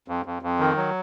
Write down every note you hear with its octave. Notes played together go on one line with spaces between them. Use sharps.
F2
F2
F2
D#3
F#3